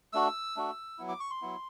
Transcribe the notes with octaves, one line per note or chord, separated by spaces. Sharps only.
A3 D4 F#4 E6
A3 D4 F#4
F#3 B3 E4
D6
C#6
C6
F#3 B3 E4